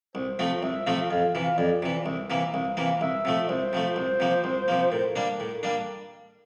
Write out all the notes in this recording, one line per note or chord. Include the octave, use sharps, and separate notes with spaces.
C2 C5
C3 F3 A3 C4
C2 E5
C3 F3 A3 C4 F5
F2 F5
C3 E3
F5
F2 D5
C3 E3
C2 E5
C3 E3 A#3
C2 F5
C3 E3 A#3
C2 E5
C3 F3 A3
C2 C5
C3 F3 A3
C2
C3 F3 A#3
C2
C3 F3 A#3
A2 A#4
G3 A#3 D4
A2
G3 A#3 D4